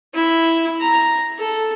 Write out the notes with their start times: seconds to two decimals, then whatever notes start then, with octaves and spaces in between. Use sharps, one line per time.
0.14 E4
0.80 A#5
1.39 A4